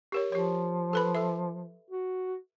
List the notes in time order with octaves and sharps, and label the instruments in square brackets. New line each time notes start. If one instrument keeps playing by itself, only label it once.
[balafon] G4 A#4 C#5
[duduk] F3 [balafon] G4 C#5
[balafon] A4 B4 B5
A4 E5
[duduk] F#4